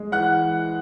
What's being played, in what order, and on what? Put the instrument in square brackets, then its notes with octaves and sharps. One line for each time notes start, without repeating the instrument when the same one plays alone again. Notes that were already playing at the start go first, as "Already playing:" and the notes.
Already playing: [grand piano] G#3
E3 F#5 F#6